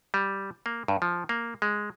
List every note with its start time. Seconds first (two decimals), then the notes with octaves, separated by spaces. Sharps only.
0.14 G3
0.66 A#3
0.88 G2
1.02 F3
1.29 A#3
1.62 G#3